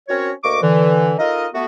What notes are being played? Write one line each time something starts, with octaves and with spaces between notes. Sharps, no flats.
C4 C#4 F#4 A#4 C#5
D2 A#3 D#5 C#6 D6
D3 E3
D#4 F4 A4 A#4 D#5
A3 B3 F#4